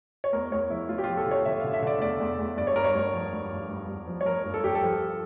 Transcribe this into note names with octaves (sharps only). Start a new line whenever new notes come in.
C#5
E2 A#4
E2 C#5
F3 E4
E2 F4
G4
F3 F4
A4
D3 C#5
D3 E5
D3 F5
E5
D3 D5
E2 D5
E2
E2
G2 D5
C#5
G2 A#4
C#5
G2
F3
G2
G2
G2
G2
F3
C#5
F3 A#4
G2
A4
G2 G4
A4
F3